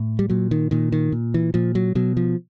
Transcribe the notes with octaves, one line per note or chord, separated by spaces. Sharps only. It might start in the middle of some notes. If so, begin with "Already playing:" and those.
Already playing: A2
G3
A#2 F#3
D#3
A#2 D#3
D#3
A#2
E3
A#2 F3
F#3
B2 F#3
F3